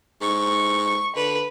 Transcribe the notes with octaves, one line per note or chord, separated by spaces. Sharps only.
G#2 C#6
D3 B4